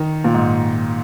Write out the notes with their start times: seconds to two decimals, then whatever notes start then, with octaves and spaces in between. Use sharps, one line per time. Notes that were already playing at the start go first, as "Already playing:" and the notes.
Already playing: D#3
0.24 A#2
0.34 G#2